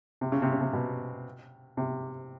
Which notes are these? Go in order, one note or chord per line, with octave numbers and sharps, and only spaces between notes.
C3
C#3
C3
C#3
C3
B2
C3